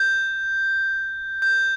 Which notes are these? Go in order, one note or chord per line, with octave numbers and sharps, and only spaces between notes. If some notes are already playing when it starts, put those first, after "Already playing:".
Already playing: G6
G6